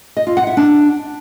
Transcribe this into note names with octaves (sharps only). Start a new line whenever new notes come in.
D#5
F4
F#5
E4
D4